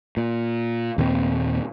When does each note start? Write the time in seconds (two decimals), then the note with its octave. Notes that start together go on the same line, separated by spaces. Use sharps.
0.17 A#2
0.98 D#2 A#2 A3 C4